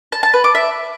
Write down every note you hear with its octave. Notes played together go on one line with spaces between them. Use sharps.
A5
A5
B4
D6
E5